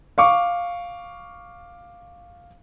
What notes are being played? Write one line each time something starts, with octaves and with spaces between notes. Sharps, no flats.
F5 C#6 D6